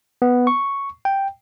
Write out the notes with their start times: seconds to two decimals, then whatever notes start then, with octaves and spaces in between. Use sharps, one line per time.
0.22 B3
0.47 C#6
1.05 G5